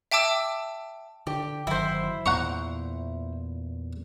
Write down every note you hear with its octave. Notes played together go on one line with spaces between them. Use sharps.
E5 G5 A5 D6 E6
D3 G4
G1 D#3 F#3 E4 C5
E2 A#2 F#5 A#5 C#6